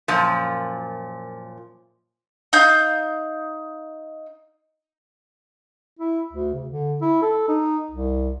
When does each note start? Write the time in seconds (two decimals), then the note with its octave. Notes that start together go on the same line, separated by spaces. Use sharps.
0.08 F#2 A#2 F3
2.53 D#4 F5 G6
5.99 E4
6.32 D2
6.54 C#3
6.69 D3
7.01 E4
7.22 A4
7.48 D#4
7.91 C2